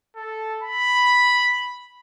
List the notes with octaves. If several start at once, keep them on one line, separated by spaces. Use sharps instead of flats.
A4
B5